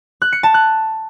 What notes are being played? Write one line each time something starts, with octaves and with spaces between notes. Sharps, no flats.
F#6
C#7
A5
F#6